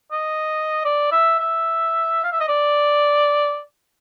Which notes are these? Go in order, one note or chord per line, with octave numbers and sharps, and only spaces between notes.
D#5
D5
E5
E5
F5
E5
D#5
D5